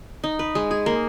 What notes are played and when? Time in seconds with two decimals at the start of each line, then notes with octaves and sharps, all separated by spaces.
0.24 D#4
0.39 B4
0.55 G#3
0.71 G#4
0.86 A#3